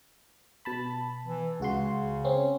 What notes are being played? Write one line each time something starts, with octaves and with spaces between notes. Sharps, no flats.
B2 A5 B5
E3
C#2 C#3 F#4 C6
C4 C#4